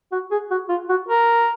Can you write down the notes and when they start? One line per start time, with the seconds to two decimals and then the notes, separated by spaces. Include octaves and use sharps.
0.12 F#4
0.31 G#4
0.51 F#4
0.69 F4
0.89 F#4
1.08 A#4